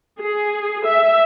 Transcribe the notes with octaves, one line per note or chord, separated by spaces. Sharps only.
G#4
E5